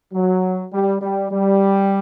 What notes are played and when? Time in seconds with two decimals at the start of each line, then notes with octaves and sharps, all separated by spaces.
0.13 F#3
0.72 G3
1.01 G3
1.31 G3